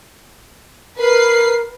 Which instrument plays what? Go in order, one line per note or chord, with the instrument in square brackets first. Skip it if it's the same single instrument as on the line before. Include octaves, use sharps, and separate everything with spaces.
[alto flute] A#4 [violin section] B4 C7